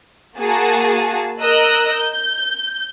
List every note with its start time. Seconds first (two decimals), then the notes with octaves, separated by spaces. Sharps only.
0.37 A#3 F#4 G#4 A5
1.41 A#4 D#5 E6 F#6
1.94 G6